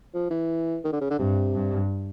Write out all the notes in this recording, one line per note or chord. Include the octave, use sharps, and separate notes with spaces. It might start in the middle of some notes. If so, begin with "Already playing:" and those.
F3
E3
D#3
D3
C#3
D3
G2 C3
G2